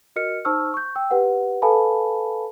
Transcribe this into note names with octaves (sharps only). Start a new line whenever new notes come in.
F#4 A#4 D#5 F6 C#7
D#4 C5 A5 C#6 E6 F6
C#6 G6
G5 E6
G4 B4 F#5
A4 B4 F5 G#5 A5 B5